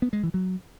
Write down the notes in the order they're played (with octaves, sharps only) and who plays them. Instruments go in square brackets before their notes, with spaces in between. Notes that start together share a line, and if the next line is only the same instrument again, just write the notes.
[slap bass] B3
G#3
E3
F#3